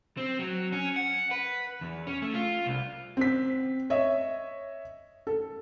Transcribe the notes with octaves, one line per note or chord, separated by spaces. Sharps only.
C4
F#3
C#4
F#5
B4
E2
C#4
A3
F4
C2
C4 B6
C#5 D#5 E5
A4